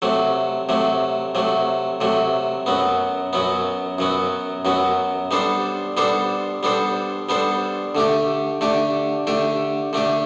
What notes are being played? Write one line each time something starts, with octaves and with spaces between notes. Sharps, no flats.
C3 F#3 A3
C3 F#3 A3
C3 F#3 A3
C3 F#3 A3
F#2 F#3 B3
F#2 F#3 B3
F#2 F#3 B3
F#2 F#3 B3
G3 B3 D4 A4 C5
G3 B3 D4 A4 C5
G3 B3 D4 A4 C5
G3 B3 D4 A4 C5
D3 A3 D4 G4
D3 A3 D4 G4
D3 A3 D4 G4
D3 A3 D4 G4